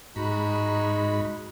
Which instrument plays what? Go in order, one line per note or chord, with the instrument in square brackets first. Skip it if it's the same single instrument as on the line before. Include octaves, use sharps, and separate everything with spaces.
[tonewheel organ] G#2 B5 [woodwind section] G#3 D#4 F#4